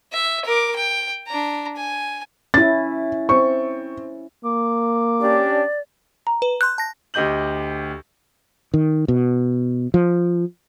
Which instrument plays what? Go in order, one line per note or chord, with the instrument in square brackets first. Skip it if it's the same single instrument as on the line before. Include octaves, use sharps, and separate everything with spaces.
[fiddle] E5
A#4 D6
G5
D4 A#5
G#5
[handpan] C#4 E4 [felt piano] A6
[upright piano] C4 [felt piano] C#6
[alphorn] A#3 [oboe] D6
[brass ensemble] C#4 D4 G4 [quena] D5
[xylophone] A#5
[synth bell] B4
[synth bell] C6 G6 [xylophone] F#6
[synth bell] A5 A#6
[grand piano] D2 G4 D#5 G6 F#7
[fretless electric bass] D#3
B2
F3